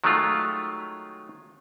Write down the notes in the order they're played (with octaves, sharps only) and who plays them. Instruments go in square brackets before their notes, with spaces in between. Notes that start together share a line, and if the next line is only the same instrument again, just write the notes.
[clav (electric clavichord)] D#3 F#3 G#3 A3 F4